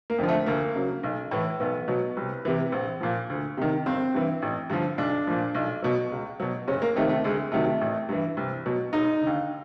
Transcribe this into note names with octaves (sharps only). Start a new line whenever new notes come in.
A#3
F2 D3 F3
A3
D2 A#3
C#3 F#3
B1
A2 E3
B1 B3
B2 F#3
C2
C3 E3
A#1
A#2 F3
D2
C3 D#3
G1 C4
G2 E3
A1
G2 D3 F3
B1 D4
A#2 F3
B1
B2 F#3
C#2
B2 F#3
F#1 C#4
A#3
F2 C3 D#3 A3
A3
D2 G#3
C3 D#3 F#3 A3
A1
G2 E3
C2
B2 F#3
E1 D#4
D3
D#2